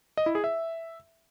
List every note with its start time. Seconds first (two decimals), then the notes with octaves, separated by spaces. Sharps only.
0.17 D#5
0.26 E4
0.35 G#4
0.44 E5